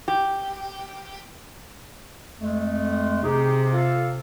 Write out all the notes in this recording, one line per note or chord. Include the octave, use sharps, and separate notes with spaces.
G4
F2 G#3 A3
C3 D#4 G4 G#4
F4 A4 F5